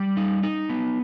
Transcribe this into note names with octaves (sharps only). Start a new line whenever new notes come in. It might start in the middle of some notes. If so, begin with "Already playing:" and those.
Already playing: G3
D#4
D#4
B3